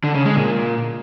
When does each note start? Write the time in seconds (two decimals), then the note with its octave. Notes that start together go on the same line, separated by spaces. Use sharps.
0.04 D3
0.15 C#3
0.25 G#3
0.36 A#2